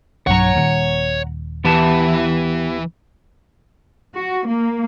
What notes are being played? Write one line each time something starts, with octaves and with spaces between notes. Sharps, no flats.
B1 G2 F#3 C#5 F#5 A#5
D#1 D#2
E3 B3 G4 A5
F#4
A#3